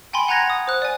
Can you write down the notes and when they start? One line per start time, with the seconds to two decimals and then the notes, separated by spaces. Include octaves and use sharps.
0.13 G5 G#5 B5 C6
0.28 F#5 G#5 A#5 F#6 G#6 A#6
0.50 D#6
0.68 C5 F#6
0.82 D5 G#5